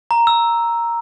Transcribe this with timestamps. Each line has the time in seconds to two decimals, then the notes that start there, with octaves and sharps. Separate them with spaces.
0.11 A#5
0.27 E6